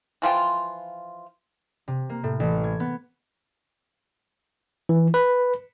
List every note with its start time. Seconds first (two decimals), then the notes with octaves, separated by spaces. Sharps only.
0.22 E3 F3 F4 G5
1.88 C3
2.10 A#3
2.24 A2
2.40 A1
2.64 G#6
2.80 B3
4.89 E3
5.14 B4